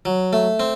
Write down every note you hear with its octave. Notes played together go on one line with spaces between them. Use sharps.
F#3
A3
C4